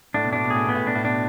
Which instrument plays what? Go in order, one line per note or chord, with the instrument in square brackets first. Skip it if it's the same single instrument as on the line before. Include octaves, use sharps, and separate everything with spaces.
[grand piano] A2 [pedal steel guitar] D4
[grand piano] B2
[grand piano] A2 [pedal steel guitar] D4
[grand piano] B2
[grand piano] A2 [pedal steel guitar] G#4
[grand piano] B2 [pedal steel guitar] B3
[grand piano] A2
[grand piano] B2 [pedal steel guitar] D4
[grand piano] A2
[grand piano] B2 [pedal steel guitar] D4